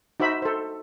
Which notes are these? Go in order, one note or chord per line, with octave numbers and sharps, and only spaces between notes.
D#4 F#4 C5 E5 B5
A4 C5